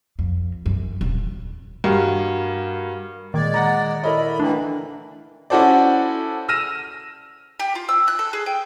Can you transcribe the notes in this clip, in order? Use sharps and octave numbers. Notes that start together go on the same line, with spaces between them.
F2
F#2
D#1
G2 F#4 A#4 F5
A#2 D#3 G#3 D5 G#6
F#5 A#5
E4 A4 A#4 C#5 D#5 B5
D3 E3 A3 A#3 D4 G5
C#4 E4 F#4 A4 C5 D5
E6 F6 A#6 D#7 E7
G4
F4
E6
F#6
A4
G#4
G5